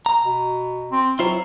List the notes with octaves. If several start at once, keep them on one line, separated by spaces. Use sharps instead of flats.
A#5
B2
C4
F#3 E4 F4 C5